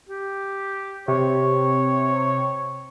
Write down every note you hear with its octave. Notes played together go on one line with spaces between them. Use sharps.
G4
C3 C#5